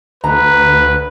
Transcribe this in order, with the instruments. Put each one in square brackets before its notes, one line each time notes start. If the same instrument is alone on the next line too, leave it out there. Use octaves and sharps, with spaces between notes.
[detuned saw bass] D2 [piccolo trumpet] B4 [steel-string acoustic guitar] A#5